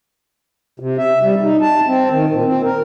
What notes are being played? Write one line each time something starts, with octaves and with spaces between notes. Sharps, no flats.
C3
E5
G3
D#4
A5
C4
D#3
A#2
C4
A#4